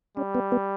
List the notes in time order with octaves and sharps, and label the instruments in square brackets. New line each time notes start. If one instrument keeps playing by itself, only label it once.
[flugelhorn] G3 [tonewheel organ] C#4
[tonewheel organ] B3
B3